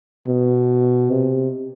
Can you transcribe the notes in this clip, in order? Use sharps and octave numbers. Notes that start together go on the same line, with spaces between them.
B2
C3